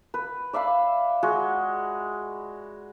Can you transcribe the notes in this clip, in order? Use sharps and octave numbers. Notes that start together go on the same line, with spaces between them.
B4
D5 E5 F5 B5
G#3 F#4